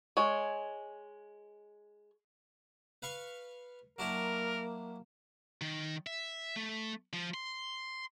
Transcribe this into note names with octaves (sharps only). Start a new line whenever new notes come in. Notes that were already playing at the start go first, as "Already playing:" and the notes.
G#3 C#5
B4 F5 C#6
F#3 A#3 D4 E4 A#4
D#3
E5
A3
F3
C6